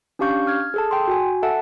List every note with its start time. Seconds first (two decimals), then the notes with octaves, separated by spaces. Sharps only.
0.19 C#4 D4 G4 F5 C#6 G6
0.47 F6 G#6
0.74 G#4 A4 A5
0.91 G5 C6
1.08 F#4 G#5
1.43 A4 E5 F#5 A5